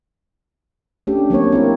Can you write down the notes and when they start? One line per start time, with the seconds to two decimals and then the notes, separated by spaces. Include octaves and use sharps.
1.07 A3 C#4 D4 G4
1.30 F#3 A#3 C4 C#5
1.52 C4 E4 A#4